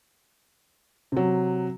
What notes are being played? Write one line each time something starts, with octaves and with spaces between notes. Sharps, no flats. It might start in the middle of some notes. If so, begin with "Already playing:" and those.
C3 F#3